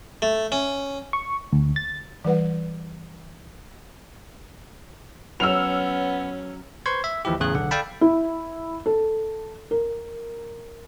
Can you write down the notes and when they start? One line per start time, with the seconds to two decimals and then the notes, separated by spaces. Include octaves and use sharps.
0.22 A3
0.52 C#4
1.13 C#6
1.53 D2
1.76 A6
2.24 E3 G3 B4 F#5
5.40 F#3 B3 C#4 E6 F6 F7
6.86 B4 C5 C6 C#6 G#6
7.04 E5
7.25 D#2 E3 F3 E4 G4
7.40 E2 A2 C#3 G#4 G#5 F#6
7.54 B1 D3 F#5
7.71 A4 D5 F5 G5 A5 B5
8.01 E4
8.86 A4
9.71 A#4